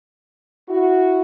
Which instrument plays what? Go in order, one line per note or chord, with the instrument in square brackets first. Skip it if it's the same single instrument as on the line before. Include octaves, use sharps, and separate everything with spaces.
[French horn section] E4 F#4